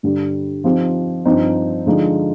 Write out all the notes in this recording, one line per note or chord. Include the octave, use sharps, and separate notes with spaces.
G2 D3 G3
F3 C4 D#4 G4
G2 F3 C4 D#4
D3 F3 G#3 D#4